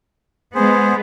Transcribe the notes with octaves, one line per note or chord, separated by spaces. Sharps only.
G#3 B3 G#4 C5